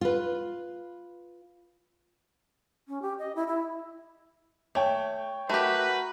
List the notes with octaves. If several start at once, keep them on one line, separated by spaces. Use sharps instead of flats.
F4 B4
C#4
G4
D#5
E4
E4
A3 C#5 G5
A3 F#4 G4 A#4 B4